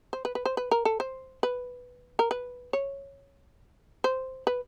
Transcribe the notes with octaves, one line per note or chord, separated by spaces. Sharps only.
C5
B4
B4
C5
B4
A#4
A4
C5
B4
A#4
B4
C#5
C5
B4